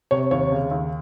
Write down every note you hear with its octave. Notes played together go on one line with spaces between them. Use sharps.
C3 C#5
D#2 C#5
C#3
D#2